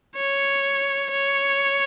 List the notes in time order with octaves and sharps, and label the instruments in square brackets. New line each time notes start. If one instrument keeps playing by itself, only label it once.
[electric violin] C#5
C#5